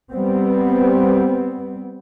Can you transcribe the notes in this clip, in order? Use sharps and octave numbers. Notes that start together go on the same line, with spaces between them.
G3 B3 C4